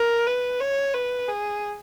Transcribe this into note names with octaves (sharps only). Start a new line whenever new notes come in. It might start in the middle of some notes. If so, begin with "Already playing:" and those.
Already playing: A#4
B4
C#5
B4
G#4